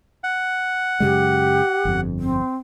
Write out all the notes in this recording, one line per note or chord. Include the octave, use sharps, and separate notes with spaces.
F#5
F#2 C#3 G#3 G4
G1 F2
C4